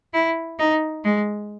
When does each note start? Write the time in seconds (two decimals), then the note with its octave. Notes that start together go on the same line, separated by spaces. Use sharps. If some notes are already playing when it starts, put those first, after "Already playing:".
0.13 E4
0.59 D#4
1.04 G#3